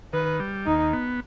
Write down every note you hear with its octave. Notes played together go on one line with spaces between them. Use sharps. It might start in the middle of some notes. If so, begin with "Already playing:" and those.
D#3 B4
G3
D#2 D#4
B3